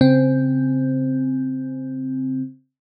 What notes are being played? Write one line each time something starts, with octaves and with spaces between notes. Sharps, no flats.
C#3 C4